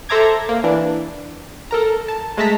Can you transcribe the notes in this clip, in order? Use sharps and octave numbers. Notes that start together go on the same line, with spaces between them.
A4 C5 E5 A#5 D6 G#6
A#3
E3 D4
A4 A#4 A#5
A5
G#3 A3 A5 A#5 B6